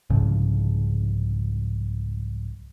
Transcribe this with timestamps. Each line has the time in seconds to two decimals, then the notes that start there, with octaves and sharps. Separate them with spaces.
0.10 C2 G#2 C#3 F3